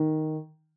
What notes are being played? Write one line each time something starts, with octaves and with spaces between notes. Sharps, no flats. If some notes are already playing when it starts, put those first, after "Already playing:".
Already playing: D#3